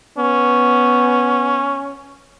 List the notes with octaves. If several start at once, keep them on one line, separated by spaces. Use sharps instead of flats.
B3 C#4